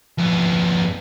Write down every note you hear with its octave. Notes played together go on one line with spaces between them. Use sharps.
F2 B3